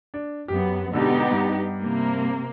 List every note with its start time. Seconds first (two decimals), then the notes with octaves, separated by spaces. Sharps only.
0.14 D4
0.48 F#2 B3 G4
0.93 G#2 B2 D3 B3 D#4 G4
1.32 G2
1.81 C3 A#3